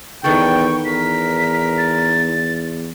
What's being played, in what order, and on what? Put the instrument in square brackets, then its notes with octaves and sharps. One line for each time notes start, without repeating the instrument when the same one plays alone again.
[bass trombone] E2 [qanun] D#3 B3 A4 [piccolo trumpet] G5 [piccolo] C#6
[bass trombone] E2 [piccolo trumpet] A#4 [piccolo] B6
[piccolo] A6